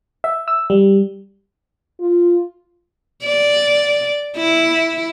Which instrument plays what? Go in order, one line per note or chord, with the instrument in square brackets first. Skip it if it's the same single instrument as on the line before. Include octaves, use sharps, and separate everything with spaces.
[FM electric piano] E5
E6
G3
[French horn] F4
[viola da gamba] D5
E4